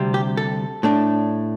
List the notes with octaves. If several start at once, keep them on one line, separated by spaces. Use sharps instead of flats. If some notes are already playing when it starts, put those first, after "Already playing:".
Already playing: D2 C3 G3 C4
G4
A4
A2 A3 D4